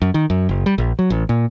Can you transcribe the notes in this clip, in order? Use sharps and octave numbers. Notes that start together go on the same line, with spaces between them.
F#2
D#3
F#2
F#1
G3
A#1
F#3
A1
A#2